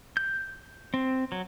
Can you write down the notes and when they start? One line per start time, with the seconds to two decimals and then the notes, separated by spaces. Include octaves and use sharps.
0.17 G6
0.94 C4
1.32 F#3